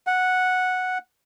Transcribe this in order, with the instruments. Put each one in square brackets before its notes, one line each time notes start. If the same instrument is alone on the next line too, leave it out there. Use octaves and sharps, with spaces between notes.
[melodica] F#5